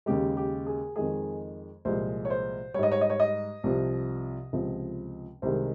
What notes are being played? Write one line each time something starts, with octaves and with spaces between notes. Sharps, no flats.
D#2 C#3 G#3 G4
G4
G#4
F2 D#3 G#3 G#4
C2 A#2 F3 G#3 C5
C#5
C5
G#2 G3 C#5 D#5
C#5
D#5
C#5
D#5
C2 C3 F3
C#2 C3 F3
C2 C3 D#3 G#3 C5